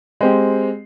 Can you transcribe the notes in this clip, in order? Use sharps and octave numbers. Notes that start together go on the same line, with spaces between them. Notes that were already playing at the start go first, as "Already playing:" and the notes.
G#3 C4 G4